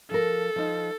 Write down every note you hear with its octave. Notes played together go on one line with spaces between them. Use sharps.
F3 A4 A#4
F3 D#4